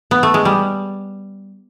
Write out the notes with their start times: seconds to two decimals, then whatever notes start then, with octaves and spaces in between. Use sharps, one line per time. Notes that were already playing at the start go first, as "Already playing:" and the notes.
0.11 B3
0.23 A3
0.34 G#3
0.45 G3